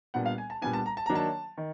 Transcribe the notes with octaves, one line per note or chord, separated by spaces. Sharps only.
A#2 G3 B3 D4 F#5
F5
G#5
A5
A#2 G3 B3 D4 G#5
A5
A#5
A5
D#3 F#3 A#3 D4 A#5
A5
D#3